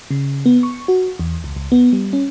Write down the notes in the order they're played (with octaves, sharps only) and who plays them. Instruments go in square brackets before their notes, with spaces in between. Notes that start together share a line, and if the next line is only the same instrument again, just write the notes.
[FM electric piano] C#3
B3
C#6
F#4
E2
C#2
C#2
B3
G3
C#4